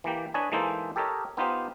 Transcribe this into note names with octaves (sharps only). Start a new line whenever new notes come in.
E3 A#3 G4
D4 B4 C#5 D#5 G#5
E3 G#3 A#3 D#4 A4 C5
G4 A4 A#4 C#5 D#5
B3 D#4 F4 G4 C5